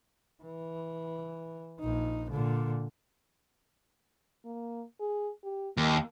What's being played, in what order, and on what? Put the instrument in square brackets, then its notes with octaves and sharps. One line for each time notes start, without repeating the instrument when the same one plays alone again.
[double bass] E3
A#1 D#4
A#2 D3
[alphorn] A#3
G#4
G4
[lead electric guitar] D#2 [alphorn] A#3